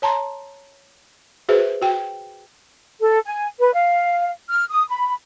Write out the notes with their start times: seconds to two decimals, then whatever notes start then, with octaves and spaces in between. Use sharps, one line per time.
0.02 C#5 A5 A#5 C6
1.49 F#4 G#4 B4 C5 E5
1.82 F#4 G5
3.00 A4
3.26 G#5
3.60 B4
3.74 F5
4.50 F6
4.70 D#6
4.89 B5